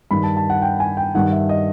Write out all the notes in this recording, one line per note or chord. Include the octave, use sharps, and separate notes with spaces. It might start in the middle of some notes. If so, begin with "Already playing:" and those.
G2 D#3 B5
A5
A5
F#5
G5
G#5
G5
G2 D#3 F#5
E5
D#5